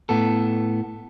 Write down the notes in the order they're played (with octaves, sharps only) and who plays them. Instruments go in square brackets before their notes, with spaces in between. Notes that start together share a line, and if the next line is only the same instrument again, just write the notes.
[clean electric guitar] A2 B3 A4